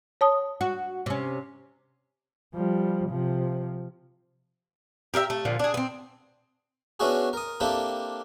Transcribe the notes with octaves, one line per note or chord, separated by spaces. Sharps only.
C#5 A5 D#6
F#4
C3 C#4
F3 G3
C3 F3
G4 A#4 D#5 E5
A3
A#2 D3 F3
D4 G#4
B3 C4
B3 C#4 D4 E4 F#4 G#4
A#4 D#6
A#3 C4 D4 E4 G4 A4